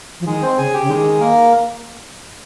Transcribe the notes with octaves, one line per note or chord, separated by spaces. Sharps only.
F3
D#3 G#3 G#4
C4 C5
C#3 G#4 G#5
G4 G5
C#3
D#3 G#3 G#4
A#3 A#4